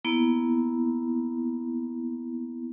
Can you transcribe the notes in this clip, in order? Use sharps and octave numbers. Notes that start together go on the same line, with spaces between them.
A#3 B3 E4